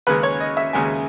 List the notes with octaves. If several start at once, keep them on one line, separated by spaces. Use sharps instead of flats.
D#2 C#3 G#3 B4
C#5
D#5
E5
D#2 C#3 G#3 G#5